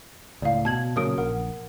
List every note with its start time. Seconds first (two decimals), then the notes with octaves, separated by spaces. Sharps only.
0.42 C#2 A2 D5 F5
0.65 B2 A5 G#6 F#7
0.96 A#2 C#3 F#3 A#4 D#6 D7
1.18 A#1 A#4 F#5